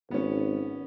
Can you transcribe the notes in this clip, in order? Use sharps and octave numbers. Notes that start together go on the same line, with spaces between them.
G#1 B3 C#4